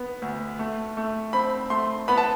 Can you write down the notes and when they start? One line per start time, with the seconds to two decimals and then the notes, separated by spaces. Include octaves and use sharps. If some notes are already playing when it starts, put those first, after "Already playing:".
Already playing: B3
0.22 D2
0.59 A3
0.97 A3
1.33 C4 B5
1.70 A3 C6
2.08 B3 B5
2.18 A5